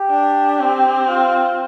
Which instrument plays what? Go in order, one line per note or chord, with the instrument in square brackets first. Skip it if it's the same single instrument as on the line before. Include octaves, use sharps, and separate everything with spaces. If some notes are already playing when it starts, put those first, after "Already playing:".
Already playing: [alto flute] G4
[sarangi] D4
C4
[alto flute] F4